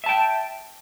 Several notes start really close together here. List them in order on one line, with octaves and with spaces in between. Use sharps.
E5 A5 G5